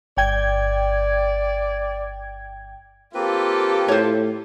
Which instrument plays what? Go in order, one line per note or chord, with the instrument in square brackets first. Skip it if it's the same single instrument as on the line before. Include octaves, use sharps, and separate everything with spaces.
[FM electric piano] G1 G5 G#6 [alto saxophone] D5
[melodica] A#3 C4 B4 [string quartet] F4 G4 A4
[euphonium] A2 [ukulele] C5 C#5